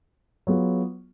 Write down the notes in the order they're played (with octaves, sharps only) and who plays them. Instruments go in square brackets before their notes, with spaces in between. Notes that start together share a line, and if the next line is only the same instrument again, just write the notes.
[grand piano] F#3 B3 F4 G#4